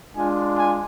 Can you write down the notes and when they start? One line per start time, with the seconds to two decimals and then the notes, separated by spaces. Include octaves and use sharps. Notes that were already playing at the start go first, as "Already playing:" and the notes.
0.15 G#3 D4 F4 G#5
0.57 G#5